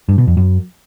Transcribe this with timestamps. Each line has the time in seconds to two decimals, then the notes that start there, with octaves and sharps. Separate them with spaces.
0.09 G2
0.18 B2
0.27 F2
0.37 F#2